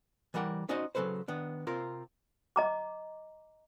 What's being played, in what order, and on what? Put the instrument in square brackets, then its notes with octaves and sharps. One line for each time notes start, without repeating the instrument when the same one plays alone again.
[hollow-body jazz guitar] E3 G3 A#4 F#5 G5
C#4 D#4 F#4 C5 D5 D#5
C#3 F#3 D#4 A4 B4 C5
D#3 B3 D4
C3 C4 F4 A#4
[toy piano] D#5 A#5 D6